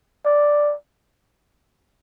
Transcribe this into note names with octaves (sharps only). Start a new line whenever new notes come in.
D5